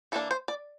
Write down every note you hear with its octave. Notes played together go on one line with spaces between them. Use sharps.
E3 A#3 D4 A4
C5
D5